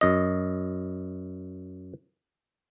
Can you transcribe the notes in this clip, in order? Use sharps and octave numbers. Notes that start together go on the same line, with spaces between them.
F#2 D#5